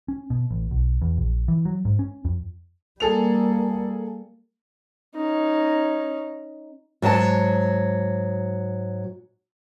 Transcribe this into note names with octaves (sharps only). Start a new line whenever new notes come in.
C#4
B2
A1
B1
E2
A#1
E3
F#3
G#2
C#4
F2
G3 A#3 G#4 A4 F7
C#4 D#4
G#2 F#3 G#5 A5